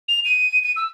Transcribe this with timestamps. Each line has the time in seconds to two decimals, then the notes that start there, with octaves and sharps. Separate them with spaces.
0.08 F7
0.25 D#7
0.63 D#7
0.76 E6